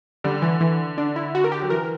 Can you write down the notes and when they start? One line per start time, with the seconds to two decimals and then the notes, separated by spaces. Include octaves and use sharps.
0.24 D3 G3
0.42 E3
0.61 E3
0.98 D4
1.16 E4
1.35 F#4
1.44 A#4
1.52 G4
1.61 F#3
1.70 E3 A#4